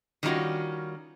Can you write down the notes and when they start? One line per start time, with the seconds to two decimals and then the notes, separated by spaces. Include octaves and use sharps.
0.23 D#3 G3 C#4 D#4 F4 F#4